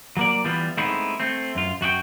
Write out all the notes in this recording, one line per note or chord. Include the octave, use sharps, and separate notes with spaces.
F#3 A#3 D5
E3 G3 B3 F4
G#3 A3 B3 C4 D#4 E4
A3 C4
F#2 F4
F#2 F#4 G4 G5